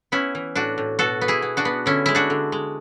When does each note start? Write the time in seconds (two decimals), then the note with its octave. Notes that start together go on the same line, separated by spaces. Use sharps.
0.12 B3 C#4 E4
0.35 E3
0.55 A2 D4 F#4
0.78 A2
0.99 B2 F#4 A4
1.21 B3
1.28 E4 G#4
1.42 B3
1.57 D4 F#4
1.65 B3
1.86 D3 C#4 E4
2.06 G#3 E4
2.15 D4 F#4
2.30 D3
2.52 G#3